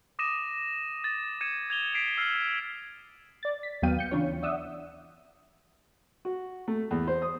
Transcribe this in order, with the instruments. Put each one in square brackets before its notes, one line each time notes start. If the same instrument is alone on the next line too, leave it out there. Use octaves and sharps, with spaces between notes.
[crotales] D6 D#6 A#6 D#7 E7
A6
G#6 C#7 D#7 E7
G#6 F7 G7
B6 C7 D7 E7
E6 F6 C7
[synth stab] D5 A6
B6
D#2 F#3 B3 F5 G5 D#7
G6 C#7
C#3 E3 D4 F4 C#5
D5 E5 F#5 D#6 E6
[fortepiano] F#4
A3
E2
C5
D#6